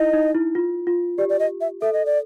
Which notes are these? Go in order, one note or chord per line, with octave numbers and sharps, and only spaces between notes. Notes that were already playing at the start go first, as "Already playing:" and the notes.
Already playing: D#4 E4 D#5
D#4
E4
F4
F4
G4 D5
D5
D#5
E5
A4 E5
D#5
D5